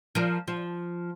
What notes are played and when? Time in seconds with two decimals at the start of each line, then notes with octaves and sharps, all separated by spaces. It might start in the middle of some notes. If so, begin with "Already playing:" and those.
0.15 F3 A#4
0.48 F3